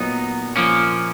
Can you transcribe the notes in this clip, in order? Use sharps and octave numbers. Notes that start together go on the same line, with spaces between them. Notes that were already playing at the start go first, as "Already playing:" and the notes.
Already playing: A#2 F#3 B3 D#4
A#2 F3 A#3 C#4